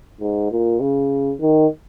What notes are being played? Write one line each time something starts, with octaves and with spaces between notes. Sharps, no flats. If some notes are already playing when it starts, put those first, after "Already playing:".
G#2
A#2
C#3
D#3